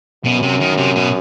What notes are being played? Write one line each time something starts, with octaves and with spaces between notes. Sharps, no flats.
F#2 B2
C3
D#3
C3
B2